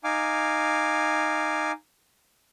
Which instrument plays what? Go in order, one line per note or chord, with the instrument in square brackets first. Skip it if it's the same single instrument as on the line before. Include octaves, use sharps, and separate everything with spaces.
[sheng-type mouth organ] D#4 F5 G#5 D6